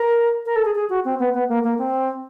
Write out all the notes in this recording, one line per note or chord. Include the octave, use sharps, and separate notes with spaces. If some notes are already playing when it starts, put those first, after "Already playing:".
Already playing: A#4
A#4
A4
G#4
G#4
F#4
C4
B3
B3
A#3
A#3
C4